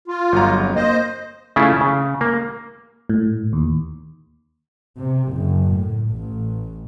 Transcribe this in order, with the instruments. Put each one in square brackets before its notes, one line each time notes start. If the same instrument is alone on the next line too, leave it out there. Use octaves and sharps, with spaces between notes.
[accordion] F4
[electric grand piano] G1 F#3 A#5
[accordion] F2
[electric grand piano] A#3 [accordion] C5 D#5
[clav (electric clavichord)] C#3 A3 C#4 E4 F4
C#3
A#3
[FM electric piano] A2
D#2
[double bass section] C3
F#1
A2
A1